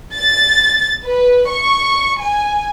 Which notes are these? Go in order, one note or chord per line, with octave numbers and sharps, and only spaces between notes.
A6
B4
C#6
G#5